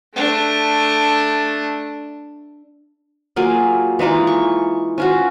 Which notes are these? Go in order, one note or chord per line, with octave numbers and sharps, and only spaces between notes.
A3 D4
F#3 A#3 F4 G#4
E3 G#3 D#4 F4
C#6
C#4 F4 F#4